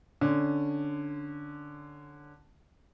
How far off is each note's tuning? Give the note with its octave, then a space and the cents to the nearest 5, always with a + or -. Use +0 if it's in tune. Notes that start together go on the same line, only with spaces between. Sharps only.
D3 +0 C#4 +0